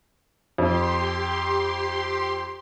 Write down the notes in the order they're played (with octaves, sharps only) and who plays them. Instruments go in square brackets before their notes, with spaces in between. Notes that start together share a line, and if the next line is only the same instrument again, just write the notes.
[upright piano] F2 [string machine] G4 C6